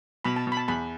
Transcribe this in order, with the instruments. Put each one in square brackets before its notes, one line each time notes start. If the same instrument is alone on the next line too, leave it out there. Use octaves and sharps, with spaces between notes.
[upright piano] B2 [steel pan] B5
[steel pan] A5
[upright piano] B2
[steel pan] B5
A5
[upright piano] E2 [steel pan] B5